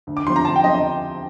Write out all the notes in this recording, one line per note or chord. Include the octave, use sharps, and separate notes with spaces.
D2
D6
D3 F3 C4 C6
A#5
D2 A5
G5
D3 F3 C4 D#5
D#5